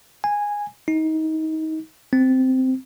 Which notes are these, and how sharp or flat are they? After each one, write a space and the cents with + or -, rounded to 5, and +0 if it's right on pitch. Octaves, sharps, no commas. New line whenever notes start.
G#5 -10
D#4 +25
C4 -10